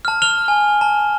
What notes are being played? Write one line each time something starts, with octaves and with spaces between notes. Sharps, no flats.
A5 F6
F6 F7 G7
G#5
A5